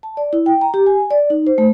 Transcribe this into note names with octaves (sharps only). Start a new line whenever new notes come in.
A5
D5
E4
G5
A#5
G4
G#5
D5
D#4
C5
A3